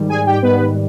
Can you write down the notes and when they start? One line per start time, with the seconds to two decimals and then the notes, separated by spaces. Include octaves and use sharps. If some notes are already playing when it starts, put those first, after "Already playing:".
Already playing: G#2 D#3 G3
0.09 G#4 G#5
0.26 G4 G5
0.42 G#2 D#3 G3 B3 B4